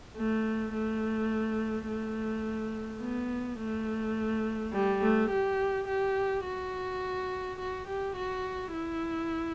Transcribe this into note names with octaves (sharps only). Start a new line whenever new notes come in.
A3
A3
A3
B3
A3
G3
A3
G4
G4
F#4
F#4
G4
F#4
E4